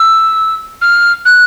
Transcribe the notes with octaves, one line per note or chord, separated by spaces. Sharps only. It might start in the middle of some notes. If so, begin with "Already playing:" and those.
Already playing: E6
F6
F#6